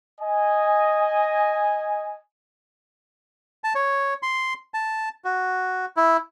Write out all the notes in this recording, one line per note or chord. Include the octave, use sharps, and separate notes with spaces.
D#5 G#5
A5
C#5
C6
A5
F#4
E4